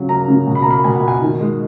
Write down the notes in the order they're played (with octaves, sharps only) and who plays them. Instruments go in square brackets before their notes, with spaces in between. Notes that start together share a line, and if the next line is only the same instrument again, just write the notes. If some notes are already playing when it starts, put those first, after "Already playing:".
Already playing: [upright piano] C#3 F#3
A#3 A#5
C#3
B2
B5
A#5
A#3 B5
B2 G#5
F#5
A#3
G#5
D#3
G#3